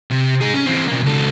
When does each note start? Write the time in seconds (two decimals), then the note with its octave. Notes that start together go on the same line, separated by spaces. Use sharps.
0.11 C3
0.41 D#4 G#4
0.54 C#4
0.66 E3 C4
0.88 B2 A#3
1.03 C#2 A4